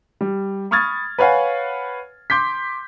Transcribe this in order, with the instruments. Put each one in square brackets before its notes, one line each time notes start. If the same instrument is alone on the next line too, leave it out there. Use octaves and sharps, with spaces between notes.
[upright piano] G3
B5 C#6 D#6 F6 G#6 A6
B4 C#5 F5 F#5 G#5
C6 D6 G6 B6